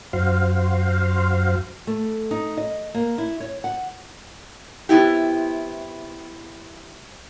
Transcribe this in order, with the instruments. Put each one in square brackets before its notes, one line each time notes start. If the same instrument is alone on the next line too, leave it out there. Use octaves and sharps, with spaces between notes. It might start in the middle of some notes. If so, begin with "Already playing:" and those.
[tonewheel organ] F#2 F#4 C5 F5
[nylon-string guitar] A3
D#4
D#5
A#3
E4
C#5
F#5
[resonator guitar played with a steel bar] C3 B3 E4 G4